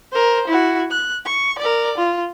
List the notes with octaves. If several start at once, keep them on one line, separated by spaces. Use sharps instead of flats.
A#4 C5
E4 F#4
F#6
C#6
A#4 D5
F4